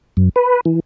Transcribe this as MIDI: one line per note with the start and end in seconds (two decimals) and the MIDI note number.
0.17 0.29 42
0.36 0.61 71
0.65 0.80 52